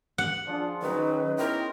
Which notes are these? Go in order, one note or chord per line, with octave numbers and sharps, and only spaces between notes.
F#5
F3 D4 F4 G#4
D#3 F#3 C#4 D#4 F#4 B4
B3 E4 A#4 C5 E5 G5